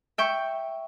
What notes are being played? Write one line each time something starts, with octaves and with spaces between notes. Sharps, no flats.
E5 G5 C#6